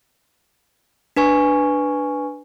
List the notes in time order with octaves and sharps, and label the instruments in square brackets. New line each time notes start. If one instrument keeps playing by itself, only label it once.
[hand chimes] D4 B4 G#5 C#6